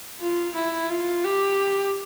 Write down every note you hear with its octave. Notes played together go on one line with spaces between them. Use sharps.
F4
E4
F4
G4